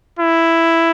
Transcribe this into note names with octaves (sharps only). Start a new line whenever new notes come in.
E4